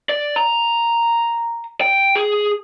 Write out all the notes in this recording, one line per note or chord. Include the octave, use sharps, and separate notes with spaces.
D5
A#5
G5
G#4